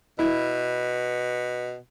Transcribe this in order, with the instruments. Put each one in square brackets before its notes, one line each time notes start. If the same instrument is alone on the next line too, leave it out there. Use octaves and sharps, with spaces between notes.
[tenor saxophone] B2 [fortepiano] E4